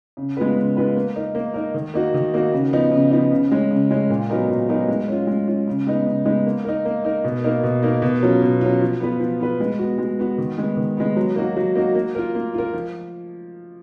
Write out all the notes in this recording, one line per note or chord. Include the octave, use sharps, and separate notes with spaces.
C#3
G#3 B3 F4 B4
C#3
G#3 B3 F4 B4
A#3
D#4 A#4
A#3
D#4 A#4
D#3
A#3 D#4 F#4
D#3
A#3 D#4 F#4
C#3
F3 B3 D#4
C#3
F3 B3 D#4
C#3
G#3 C#4
C#3
G#3 C#4
A#2
F#3 B3 D#4 A#4
A#2
F#3 B3 D#4 A#4
G#3
C#4 F4
G#3
C#4 F4
C#3
G#3 B3 D#4
C#3
G#3 B3 D#4
A#3
D#4 A#4
A#3
D#4 A#4
B2
A#3 D#4 A#4
B2
A#3 D#4 A#4
B2
F#3 C#4 F4
B2
F#3 C#4 F4
F3
B3 F4 B4
F3
B3 F4 B4
G#3
B3 F#4
G#3
B3 F#4
D#3
G#3 B3
D#3
G#3 B3
F#3
A#3 D#4 F#4
F#3
A#3 D#4 F#4
A#3
F4 A#4
A#3
F4 A#4
F3